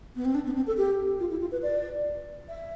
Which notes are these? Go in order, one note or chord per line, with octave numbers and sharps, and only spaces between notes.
B3
C4
D4
B3
C4
A4
G4
F4
E4
F4
B4
D5
E5